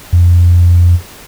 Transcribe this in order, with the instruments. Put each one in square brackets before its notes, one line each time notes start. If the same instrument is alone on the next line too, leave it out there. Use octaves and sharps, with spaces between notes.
[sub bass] F2